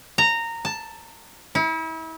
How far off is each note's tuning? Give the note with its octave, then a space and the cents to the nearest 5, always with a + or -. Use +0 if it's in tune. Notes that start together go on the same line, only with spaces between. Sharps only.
A#5 -15
A5 +5
E4 -35